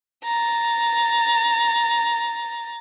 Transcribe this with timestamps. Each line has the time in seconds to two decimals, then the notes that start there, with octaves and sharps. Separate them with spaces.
0.24 A#5 A6